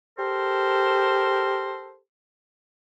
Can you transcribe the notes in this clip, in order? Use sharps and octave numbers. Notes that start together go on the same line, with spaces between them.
G4 A4 A#4 C5